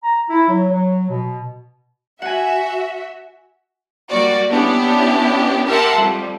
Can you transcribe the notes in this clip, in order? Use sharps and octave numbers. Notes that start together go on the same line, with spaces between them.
A#5
E4
F#3
F#3
B2
F#4 E5 F#5 G#5
G3 A#3 F#4 D5
B3 C#4 D4 E4 G4
G4 A#4 E5 F#5 A5 C6
F2 G3